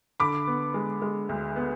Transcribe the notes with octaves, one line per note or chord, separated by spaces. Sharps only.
D3 B5 D6
B3
G#3
G#3
D2
B3